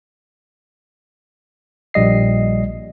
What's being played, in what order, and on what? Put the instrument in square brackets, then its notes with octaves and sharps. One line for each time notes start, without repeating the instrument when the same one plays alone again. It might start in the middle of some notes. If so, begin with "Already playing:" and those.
[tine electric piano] A#1 G3 D#5 C7